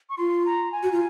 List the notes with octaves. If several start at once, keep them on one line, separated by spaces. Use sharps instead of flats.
C#6
F4 C6
A#5
G#5
F#4
F4